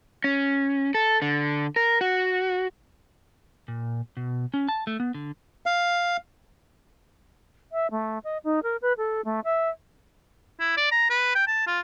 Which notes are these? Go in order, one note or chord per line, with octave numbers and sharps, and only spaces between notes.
C#4
A4
D3
A#4
F#4
A#2
B2
C#4
A5
A3
B3
D3
F5
E5
A3
D#5
D#4
A#4
B4
A4
A3
E5
E4
D5
A#5
B4
G5
A5
F4